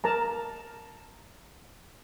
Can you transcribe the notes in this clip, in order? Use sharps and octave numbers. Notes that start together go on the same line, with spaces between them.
A#4 A5 A#5